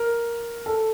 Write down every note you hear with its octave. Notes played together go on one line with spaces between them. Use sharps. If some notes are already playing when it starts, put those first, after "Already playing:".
Already playing: A#4
A4